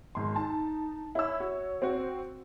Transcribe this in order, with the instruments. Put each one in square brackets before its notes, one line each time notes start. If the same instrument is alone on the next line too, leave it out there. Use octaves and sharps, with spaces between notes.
[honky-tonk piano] G#1 C6
[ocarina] D#4 [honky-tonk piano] A5
[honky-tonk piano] E4 E6 [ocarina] C#5
[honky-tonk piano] F#4
C4 F#4